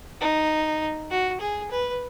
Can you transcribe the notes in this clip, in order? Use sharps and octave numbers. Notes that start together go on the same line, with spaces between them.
D#4
F#4
G#4
B4